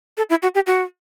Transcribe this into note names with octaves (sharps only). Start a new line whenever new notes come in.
A4
E4
F#4
G4
F#4